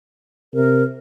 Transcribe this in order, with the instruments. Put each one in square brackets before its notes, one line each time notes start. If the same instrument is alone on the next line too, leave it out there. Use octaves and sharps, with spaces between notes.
[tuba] C3 [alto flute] A#4